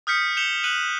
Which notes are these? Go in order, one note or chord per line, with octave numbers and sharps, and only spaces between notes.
D#6 F6 G6 B6 C#7
G6 C#7 E7 F7 G7
F#6 D#7 F#7